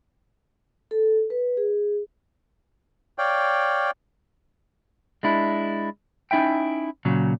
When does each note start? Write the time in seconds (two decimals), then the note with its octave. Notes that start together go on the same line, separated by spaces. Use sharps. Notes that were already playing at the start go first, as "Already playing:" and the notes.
0.91 A4
1.30 B4
1.57 G#4
3.18 C#5 D5 F5 G5
5.23 G#3 D4 E4
6.31 C#4 D#4 E4 E5 G5
7.05 A#2 C#3 F#3